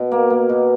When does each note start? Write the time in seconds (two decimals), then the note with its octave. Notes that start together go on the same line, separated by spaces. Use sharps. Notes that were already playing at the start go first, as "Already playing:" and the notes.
Already playing: B2
0.11 A#3
0.30 A#3
0.49 B2